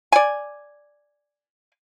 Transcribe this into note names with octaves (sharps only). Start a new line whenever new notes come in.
D5 G#5